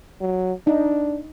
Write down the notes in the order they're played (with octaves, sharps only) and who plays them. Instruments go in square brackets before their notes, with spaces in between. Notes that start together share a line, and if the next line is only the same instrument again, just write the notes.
[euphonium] F#3
[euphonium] D4 [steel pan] D#4